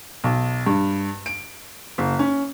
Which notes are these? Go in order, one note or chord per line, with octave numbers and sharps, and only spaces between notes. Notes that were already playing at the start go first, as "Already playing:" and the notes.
B1
G2
D7
F#1
C#4